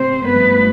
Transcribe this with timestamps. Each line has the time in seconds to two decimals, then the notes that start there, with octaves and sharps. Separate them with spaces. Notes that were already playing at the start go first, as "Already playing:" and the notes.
Already playing: C3 C4 C5
0.26 G2 F3 A3 B3 B4